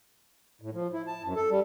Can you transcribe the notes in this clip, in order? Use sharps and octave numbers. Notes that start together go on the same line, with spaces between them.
A2
F3
E4
A5
F#2
A4
G3